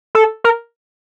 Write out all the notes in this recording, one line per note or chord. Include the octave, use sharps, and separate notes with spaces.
A4
A#4